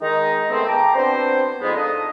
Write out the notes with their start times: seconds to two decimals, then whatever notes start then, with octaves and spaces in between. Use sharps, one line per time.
0.01 D#3 G#3 D#4
0.49 D#3 G#3 A3 B3 C4
0.68 G5 A5 A#5 D6
0.95 B3 C4 D4 F#4 C5
1.61 F2 G#2 G#3 B3
1.75 D4 D#4 F4 A4 D#5